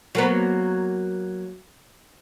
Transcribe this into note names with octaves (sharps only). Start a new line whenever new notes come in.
F#3 A#3 B3